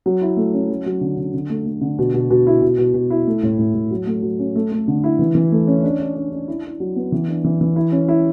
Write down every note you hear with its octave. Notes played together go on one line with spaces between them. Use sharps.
F#3
E4
A3
C#4
F#3
F#3
D3
D3
D3
A3
A3
D3
B2
B2
B2
E4
B2
B2
B2
E4
A3
A2
A2
A2
F#3
A3
F#3
C#4
A3
A3
D3
E4
E3
E3
A3
C#4
D4
D4
D4
D4
E4
E4
F#3
B3
E3
D4
E3
E3
E4
C#4
E4